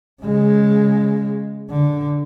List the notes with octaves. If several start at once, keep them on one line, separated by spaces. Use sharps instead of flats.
C#3 G#3
D3